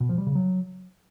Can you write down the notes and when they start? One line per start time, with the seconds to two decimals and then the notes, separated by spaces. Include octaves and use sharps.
0.01 B2
0.09 F3
0.18 G3
0.27 C#3
0.35 F#3